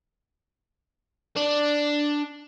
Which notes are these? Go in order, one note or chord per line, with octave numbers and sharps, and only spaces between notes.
D4